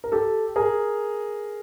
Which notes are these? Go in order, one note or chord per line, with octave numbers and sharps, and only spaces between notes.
A#4
G4 A4
G#4 A#4